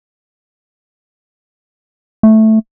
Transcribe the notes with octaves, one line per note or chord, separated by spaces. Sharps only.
A3